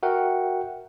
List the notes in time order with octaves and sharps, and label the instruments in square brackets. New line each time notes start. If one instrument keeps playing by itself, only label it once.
[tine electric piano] F#4 A#4 E5 F#5 G5